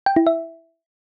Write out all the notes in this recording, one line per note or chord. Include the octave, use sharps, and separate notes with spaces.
G5
E4
E5